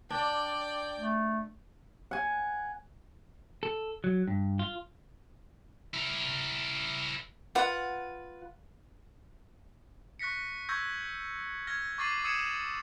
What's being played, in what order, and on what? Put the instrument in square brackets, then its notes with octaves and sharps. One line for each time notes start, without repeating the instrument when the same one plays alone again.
[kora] D4 [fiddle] D5 G5
[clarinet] A3
[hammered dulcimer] F#5 G#5
[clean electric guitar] A4
F#3
G2
F4
[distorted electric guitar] E4 A#4
[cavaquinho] F4 B4 F#5
[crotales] C#6 F#6 A#6 B6 C#7
C#6 E6 G6 G#6 A#6
F6 G#6 A#6
C#6 D6 A6 C7 D#7 F#7
D#6 E6 G#6 C#7 D#7 E7